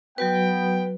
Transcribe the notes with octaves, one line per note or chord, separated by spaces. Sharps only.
F#3 B3 F#4 B4 G5